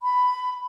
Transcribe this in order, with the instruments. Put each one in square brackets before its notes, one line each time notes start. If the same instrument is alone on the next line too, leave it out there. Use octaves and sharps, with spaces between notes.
[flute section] B5